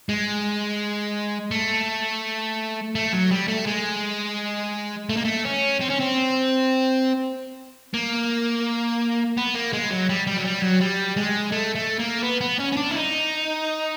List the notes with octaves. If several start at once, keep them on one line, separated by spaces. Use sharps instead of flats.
G#3
A3
A3
F#3
G3
A3
G#3
A3
A#3
A3
C#4
C4
C#4
C4
A#3
B3
A#3
G#3
F#3
G3
G3
F#3
G3
F#3
G3
G#3
A3
A3
A#3
B3
B3
C#4
C#4
D4
E4
D#4